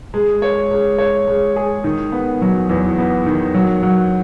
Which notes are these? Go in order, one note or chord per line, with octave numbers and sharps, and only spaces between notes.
G#3
C#5
G#3
C#5
G#3
G#4
D#3
B3
F#3
E2
B3
D#3
F#3
F#3